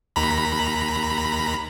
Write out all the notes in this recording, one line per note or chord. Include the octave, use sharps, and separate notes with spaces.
D#2 A#5 B5